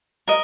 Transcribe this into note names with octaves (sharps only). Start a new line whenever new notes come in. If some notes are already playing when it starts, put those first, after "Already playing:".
A#4 D#5